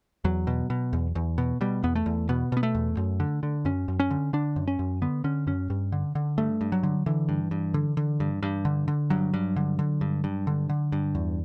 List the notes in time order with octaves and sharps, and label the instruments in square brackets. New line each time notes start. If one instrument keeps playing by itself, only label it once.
[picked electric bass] E2 F#3
B2
B2
E2
E2
B2
B2 G3
E2 B3
A3
E2
B2 B3
B2 B3
A3
E2
F#2
D3
D3
F#2 C#4
F#2
C#4
D3
D3 D4
F#2
C#4
F#2
D3 B3
D3 C#4
F#2 C#4
G2
D3
D3
G2 A3
G2
F#3
D3
D3 E3
G2
G2
D3
D3
G2
G2
D3
D3
G2 F#3
G2
D3
D3
G2
G2
D3
D3
G2
E2